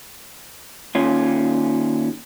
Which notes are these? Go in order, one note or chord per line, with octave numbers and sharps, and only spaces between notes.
D#2 C#4 F4